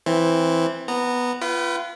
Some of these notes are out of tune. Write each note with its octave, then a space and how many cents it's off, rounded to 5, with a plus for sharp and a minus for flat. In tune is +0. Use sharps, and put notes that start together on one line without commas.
E3 +0 C4 +5
B3 +0 A#5 -20
F4 -30 B4 +0 G5 -45